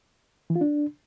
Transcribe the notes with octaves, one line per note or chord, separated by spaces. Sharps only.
E3
F4
D4